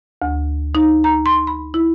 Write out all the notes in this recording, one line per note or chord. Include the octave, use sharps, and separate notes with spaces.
D2
D#4
A#5
C6
B5
E4